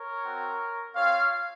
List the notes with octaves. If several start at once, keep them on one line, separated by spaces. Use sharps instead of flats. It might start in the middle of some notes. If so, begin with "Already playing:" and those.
Already playing: A#4 C#5
C4 F#4
C4 F4 C#5 F5